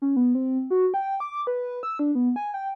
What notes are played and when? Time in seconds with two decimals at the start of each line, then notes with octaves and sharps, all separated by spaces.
0.02 C#4
0.16 B3
0.35 C4
0.70 F#4
0.94 G5
1.20 D6
1.47 B4
1.83 E6
1.99 D4
2.15 B3
2.36 G#5
2.54 G5